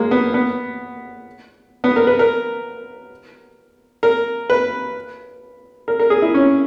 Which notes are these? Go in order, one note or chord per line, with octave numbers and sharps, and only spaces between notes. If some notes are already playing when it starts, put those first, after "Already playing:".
Already playing: G#3 A#3
B3
B3
B3
A#4
B4
A#4
A#4
B4
A#4
A#4
G#4
E4
C#4